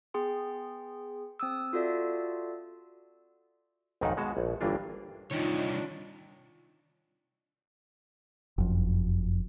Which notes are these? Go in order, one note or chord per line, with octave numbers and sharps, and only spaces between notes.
B3 G#4 G5 C6
C4 D#6 E6
F4 F#4 A4 D5 E5
B1 F2 G#2 D#3 D#4 F#5
B2 G#3 F#4 A5
A#1
G1 G2 E3 A#3 D4 F4
C2 D#3 D4 D#4 F4 C#5
F#1 F2